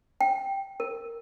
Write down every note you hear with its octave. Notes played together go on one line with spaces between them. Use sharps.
G5
A#4